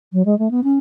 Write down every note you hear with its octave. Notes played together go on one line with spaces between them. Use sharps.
F#3
G#3
A3
B3
C#4